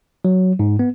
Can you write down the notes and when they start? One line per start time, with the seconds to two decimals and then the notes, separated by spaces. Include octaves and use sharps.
0.25 F#3
0.59 G#2
0.79 B3